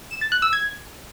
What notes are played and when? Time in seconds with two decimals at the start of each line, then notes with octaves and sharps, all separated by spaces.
0.11 E7
0.21 A6
0.32 F#6
0.42 E6
0.53 G#6